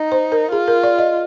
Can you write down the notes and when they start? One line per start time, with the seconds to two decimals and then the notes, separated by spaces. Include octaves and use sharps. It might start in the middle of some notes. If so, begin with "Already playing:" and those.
Already playing: D#4
0.12 C5
0.32 A#4
0.52 F4 G#4
0.68 A#4
0.83 D5
0.99 D#5